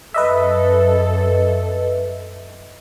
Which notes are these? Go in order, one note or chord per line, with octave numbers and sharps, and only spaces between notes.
F#2 A4 B4 D#5 E5